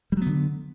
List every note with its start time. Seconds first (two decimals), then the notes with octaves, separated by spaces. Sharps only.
0.12 G3
0.17 F#3
0.22 B3
0.26 D3